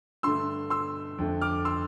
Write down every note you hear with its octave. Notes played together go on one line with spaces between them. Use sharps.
G2 D3 A3 C6 E6
C6 E6
F2 D3 A3
D6 F6
C6 E6